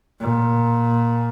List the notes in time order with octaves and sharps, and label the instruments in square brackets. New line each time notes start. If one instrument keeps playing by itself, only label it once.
[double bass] A#2